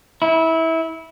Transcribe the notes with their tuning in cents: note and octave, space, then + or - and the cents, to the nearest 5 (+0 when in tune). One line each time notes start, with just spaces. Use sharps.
E4 -20